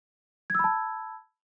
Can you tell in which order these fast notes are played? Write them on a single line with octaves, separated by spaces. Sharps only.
G#6 E6 B5 A5